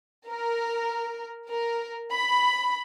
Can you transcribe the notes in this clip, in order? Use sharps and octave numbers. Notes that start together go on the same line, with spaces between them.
A#4
A#4
B5